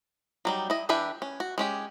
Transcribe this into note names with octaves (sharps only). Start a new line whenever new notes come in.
F#3 G3 D#4
E4 D#5
E3 D4 G4 B4 E5
C#4
F#4
G#3 C#4 G4